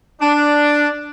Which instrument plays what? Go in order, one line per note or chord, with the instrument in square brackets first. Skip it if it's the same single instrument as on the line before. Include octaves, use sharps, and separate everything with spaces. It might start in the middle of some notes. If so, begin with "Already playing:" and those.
[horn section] D4